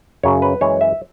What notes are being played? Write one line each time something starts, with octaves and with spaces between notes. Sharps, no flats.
F#2 C#3 F#3 C#5
B4
F#2 E3 G#3 C#5
E5